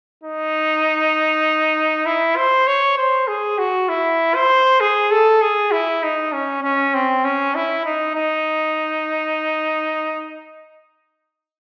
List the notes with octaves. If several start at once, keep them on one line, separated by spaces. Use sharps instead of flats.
D#4
E4
C5
C#5
C5
G#4
F#4
E4
C5
G#4
A4
G#4
E4
D#4
C#4
C#4
C4
C#4
E4
D#4
D#4